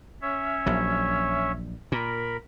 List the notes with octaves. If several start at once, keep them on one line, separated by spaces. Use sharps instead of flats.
C#4 C#5 E5
A#1 F#3
A#2 A#4 B5